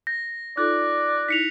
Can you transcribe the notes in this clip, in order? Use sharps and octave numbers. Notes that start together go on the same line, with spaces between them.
G6 A#6
D#4 F4 A4 D5 F#6
D#4 E4 B6 C#7 F7